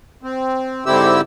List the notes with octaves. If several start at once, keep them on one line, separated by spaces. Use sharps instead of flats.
C4
G#2 D3 C4 E4 G4 E6